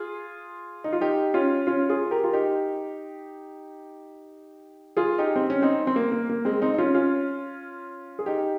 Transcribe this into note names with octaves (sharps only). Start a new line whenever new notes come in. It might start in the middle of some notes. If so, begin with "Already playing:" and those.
Already playing: F4 G#4
D#4
F4
D#4 G4
C#4 F4
C#4 F4
F4 G#4
G4 A#4
F4
D#4 G4
F4 G#4
D#4 G4
C4
C#4
C4 D#4
C4
A#3
A#3
A#3
G#3 C4
C4 D#4
D#4
C#4 F4
C#4 F4
G#4
D#4 G4